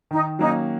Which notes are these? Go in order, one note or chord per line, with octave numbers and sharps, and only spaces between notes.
D#3 D#4
F#3 A#3 C#4 D#4